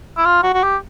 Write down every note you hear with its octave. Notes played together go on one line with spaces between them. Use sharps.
E4
F4
F#4
F#4
G4